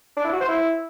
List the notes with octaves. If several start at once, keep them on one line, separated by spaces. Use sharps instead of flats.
D4
E4
F#4
C5
E4